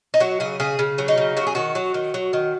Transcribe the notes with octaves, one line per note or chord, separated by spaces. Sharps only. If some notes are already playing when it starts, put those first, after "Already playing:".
D#4
F#3 F#4
C#3 G#4
C#3 G#4
C#3
F#3
D#4
C#3
F#3 F#4
G#4
D#3 F#4
F#3
D#3
F#3
D#3